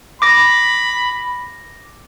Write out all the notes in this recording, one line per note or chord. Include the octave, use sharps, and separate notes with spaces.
B5 D6 A#6